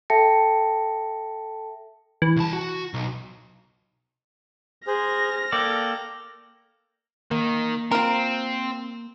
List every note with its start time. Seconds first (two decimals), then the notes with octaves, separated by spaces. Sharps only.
0.10 A4 E5 G5 A5 A#6 C#7
2.22 E3
2.36 C2 A5
2.53 F#4
2.94 B1
4.87 G#4 C5 F6 A#6
5.52 A#3 A4 D5 G5
7.31 D#3 A#3
7.91 C4 F4 A#4